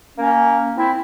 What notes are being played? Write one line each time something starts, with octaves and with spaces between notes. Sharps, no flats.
A#3 C#4
C4 E4